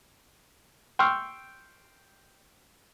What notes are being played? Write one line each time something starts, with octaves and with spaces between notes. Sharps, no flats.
G5 C6 C#6 E6 F6